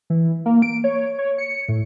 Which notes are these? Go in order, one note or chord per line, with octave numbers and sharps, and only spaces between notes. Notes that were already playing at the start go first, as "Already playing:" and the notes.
E3
A#3
D7
C#5
C#5
C#7
A2